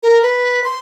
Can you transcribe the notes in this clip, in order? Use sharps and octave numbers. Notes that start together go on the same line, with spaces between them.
A#4
B4
C6